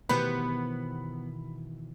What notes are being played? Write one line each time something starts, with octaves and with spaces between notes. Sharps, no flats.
B2 D#3 E3 B3 G4 C5 B5